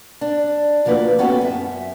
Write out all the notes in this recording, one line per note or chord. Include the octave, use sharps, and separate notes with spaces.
D4
D2 F3 A#3 F#4 B4
B3 C#4 F#4 G4 A4
F#2 E5